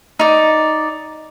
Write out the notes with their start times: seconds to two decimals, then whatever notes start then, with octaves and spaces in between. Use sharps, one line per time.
0.19 D#4 D5